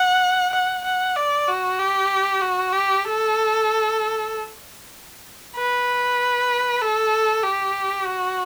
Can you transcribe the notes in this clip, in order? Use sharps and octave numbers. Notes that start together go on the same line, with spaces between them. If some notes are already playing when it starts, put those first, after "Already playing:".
Already playing: F#5
F#5
F#5
D5
F#4
G4
F#4
G4
A4
B4
A4
G4
F#4